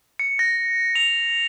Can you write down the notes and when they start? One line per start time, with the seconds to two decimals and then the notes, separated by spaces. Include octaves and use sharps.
0.19 C#7
0.39 A#6
0.95 F7